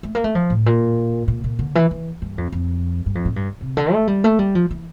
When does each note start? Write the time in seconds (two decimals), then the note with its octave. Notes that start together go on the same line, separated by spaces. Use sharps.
0.03 A3
0.15 A#3
0.24 A3
0.35 F3
0.50 A2
0.66 A#2
1.28 A#2
1.44 A#2
1.59 D3
1.75 E3
1.91 E3
2.22 G2
2.38 F2
2.52 F2
3.06 G2
3.15 F2
3.25 A2
3.36 G2
3.61 C3
3.77 D3
3.93 A3
4.07 G3
4.24 A3
4.39 G3
4.55 F3
4.71 E3